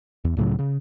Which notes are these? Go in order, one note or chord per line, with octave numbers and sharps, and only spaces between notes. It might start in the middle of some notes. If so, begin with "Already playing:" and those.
E2
C#2 A2 C#3 F#3
C#3